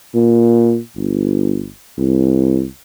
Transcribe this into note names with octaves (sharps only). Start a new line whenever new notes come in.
A#2
G1
C2